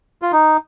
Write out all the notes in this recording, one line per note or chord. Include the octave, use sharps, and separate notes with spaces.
F4
D#4